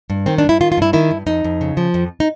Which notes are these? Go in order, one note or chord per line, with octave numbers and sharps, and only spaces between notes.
G2
D#3 C4
D4
G2
E4
D#3 F4
F4
G2 E4
D#3 E4
G2
F2 D#4
F2
C#3
F3
F2
D#4